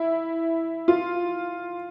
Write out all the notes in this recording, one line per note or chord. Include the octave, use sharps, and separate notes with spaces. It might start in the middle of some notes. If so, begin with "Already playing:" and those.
Already playing: E4
F4